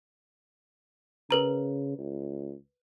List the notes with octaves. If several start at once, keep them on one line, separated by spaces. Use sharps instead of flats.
C#3 A#4 B4 A#5
C#2